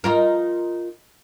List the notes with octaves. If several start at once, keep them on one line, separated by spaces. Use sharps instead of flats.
D#4 F4 A#4